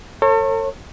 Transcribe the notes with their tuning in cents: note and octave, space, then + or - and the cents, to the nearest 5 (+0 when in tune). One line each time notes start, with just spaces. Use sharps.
A4 +40 C#5 -30